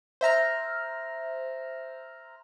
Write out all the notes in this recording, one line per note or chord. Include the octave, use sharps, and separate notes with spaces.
C5 E5 A#5 F6